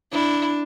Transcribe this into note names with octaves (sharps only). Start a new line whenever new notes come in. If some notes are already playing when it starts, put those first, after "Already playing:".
D4 E4